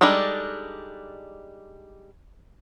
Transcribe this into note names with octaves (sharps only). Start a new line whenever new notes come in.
G3 G#3 D4 D#4 A4